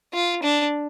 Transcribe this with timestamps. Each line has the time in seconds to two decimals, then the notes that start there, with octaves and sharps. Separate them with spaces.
0.14 F4
0.43 D4